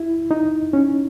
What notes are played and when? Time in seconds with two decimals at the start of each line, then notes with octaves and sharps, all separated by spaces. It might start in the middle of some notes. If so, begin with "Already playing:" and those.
Already playing: E4
0.31 D#4
0.73 C#4